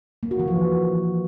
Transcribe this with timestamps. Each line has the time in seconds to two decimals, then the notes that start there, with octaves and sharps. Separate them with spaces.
0.23 A#3
0.31 F#4
0.39 E3
0.48 F3